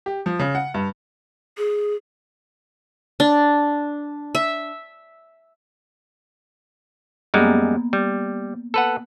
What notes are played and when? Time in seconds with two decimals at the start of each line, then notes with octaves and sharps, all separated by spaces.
0.06 G4
0.26 F3
0.39 C#3
0.55 F#5
0.74 G2
1.57 G#4
3.20 D4
4.35 E5
7.34 F#2 G3 G#3 A#3 B3
7.93 G3
8.74 A4 B4 F#5